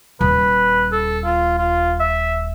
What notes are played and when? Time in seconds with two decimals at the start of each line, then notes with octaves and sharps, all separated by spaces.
0.21 D#1 B4
0.92 A4
1.25 F4
1.59 F4
2.00 E5